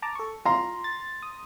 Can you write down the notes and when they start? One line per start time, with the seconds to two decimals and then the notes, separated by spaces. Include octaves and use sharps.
0.02 A5 A#5 D6
0.15 A4 C#6
0.45 F4 A#5 C6
0.84 A6
1.22 D#6